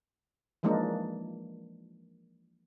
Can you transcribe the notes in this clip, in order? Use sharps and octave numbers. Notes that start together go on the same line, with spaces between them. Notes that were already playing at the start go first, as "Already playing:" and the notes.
E3 F3 G#3 A#3 D4 D#4